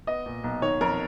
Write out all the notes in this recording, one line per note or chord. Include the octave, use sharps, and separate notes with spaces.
B3 D#5
A#2
B1
D#3 C#5
F2 A#4